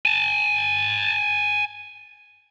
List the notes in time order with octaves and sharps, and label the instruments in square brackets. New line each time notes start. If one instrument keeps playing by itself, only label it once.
[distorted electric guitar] G#5 A5